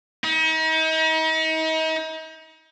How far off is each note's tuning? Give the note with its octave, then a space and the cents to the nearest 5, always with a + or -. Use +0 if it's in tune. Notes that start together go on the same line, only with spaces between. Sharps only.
D#4 +40